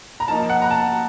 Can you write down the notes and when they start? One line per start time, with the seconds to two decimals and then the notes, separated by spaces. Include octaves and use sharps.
0.20 A#5
0.28 F3 A#3 D#4 A5
0.49 F#5
0.62 A#5
0.70 A5